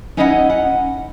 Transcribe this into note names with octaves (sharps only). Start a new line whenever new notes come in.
C#4 D#4 E4 D#5 F5 F#5
F#5